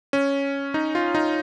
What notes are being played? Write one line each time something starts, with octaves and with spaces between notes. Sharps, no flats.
C#4
D#4
F4
D#4